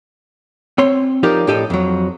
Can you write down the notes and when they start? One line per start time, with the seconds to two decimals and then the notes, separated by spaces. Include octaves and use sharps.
0.78 C4 C#5 C6
1.23 F3 D#4 G4 A#4 D5
1.47 A2 D4 G4 A4 D#5
1.70 F2 F#3